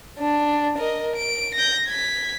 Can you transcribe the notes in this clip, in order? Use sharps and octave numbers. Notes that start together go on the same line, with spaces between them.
D4
A#4 D#5
D7
G6 A#6
G#6 B6